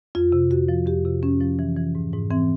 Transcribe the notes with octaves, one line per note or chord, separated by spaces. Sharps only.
F2 F4
C3
F2 F#4
F3
F2 G4
C3
F2 C#4
F3
E3
E3
G#2
G#2
E3 C4